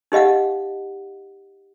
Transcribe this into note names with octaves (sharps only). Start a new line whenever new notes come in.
D#4 G4 D#5 F5 F#5